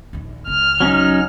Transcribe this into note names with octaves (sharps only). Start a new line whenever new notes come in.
A#1 D#2
C#2 F6
F#3 C#4 D#4